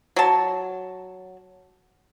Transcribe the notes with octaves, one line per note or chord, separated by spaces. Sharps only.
F#3 A5